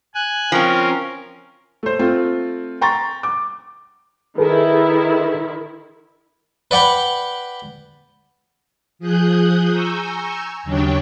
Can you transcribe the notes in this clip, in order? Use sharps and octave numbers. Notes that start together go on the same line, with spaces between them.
G#5 F#6
F3 C4 C#4 A#4
A3 C5
A3 C4 F4
G5 A#5 C6 C#6 A6
D6
D#3 E4 G#4 A4 B4
B4 D5 F#5 G5 B5
F3 G#4 D#6 F#6 G6
G#5 A#5 C#6 E6 G6
D#2 C#3 F#3 D4 C#5 G5